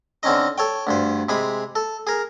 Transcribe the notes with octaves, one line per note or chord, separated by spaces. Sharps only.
D3 C4 C#4 D#4 D#5
A4 C#5 G5
D2 G2 C5
C3 G#3 G#4 B5
A4
G#4 A#4